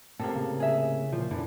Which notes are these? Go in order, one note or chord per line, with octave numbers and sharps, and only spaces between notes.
A2 C3 A#3 A4
C#3
G#4 E5
A#2 F3
F#2 D3 E3